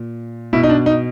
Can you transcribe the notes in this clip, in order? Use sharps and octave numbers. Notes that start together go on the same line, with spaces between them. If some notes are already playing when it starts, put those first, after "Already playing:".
Already playing: A#2
B2 E4
D#4
D4
D#4